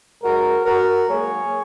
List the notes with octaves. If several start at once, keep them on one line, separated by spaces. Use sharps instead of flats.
G#2 G#3 F#4 A#4
F#4 A#4
G#2 F#3 A#3 G#4 C#5